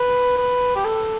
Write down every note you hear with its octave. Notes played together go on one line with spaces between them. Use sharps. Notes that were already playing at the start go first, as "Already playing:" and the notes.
Already playing: B4
B4
G4
A4